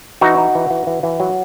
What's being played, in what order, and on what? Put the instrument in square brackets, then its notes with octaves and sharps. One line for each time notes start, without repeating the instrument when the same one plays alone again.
[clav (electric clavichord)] E3 D#4 F#4
D#4
E3
E3
E3
E3
F#3